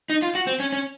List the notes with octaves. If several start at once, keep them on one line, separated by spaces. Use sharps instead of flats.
D#4
F4
F#4
C4
C#4
C#4